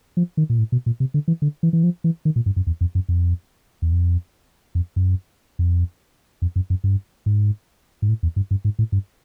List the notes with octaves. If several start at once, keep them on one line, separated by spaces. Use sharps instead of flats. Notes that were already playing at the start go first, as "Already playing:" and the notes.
F3
D#3
A#2
A2
B2
A#2
C3
D3
E3
D3
E3
E3
F3
E3
D#3
A#2
G2
F#2
E2
F2
F#2
F2
E2
F2
F2
F#2
F2
F2
F#2
F#2
G2
G#2
G#2
A2
E2
G2
G2
G#2
A2
G2